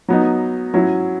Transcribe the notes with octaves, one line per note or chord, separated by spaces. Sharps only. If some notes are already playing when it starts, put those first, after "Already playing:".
F#3 B3 D#4
F#3 C#4 E4